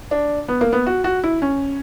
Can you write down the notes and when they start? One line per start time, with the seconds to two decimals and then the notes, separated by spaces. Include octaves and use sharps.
0.11 D4
0.48 B3
0.61 A#3
0.72 B3
0.86 F#4
1.04 F#4
1.24 E4
1.42 C#4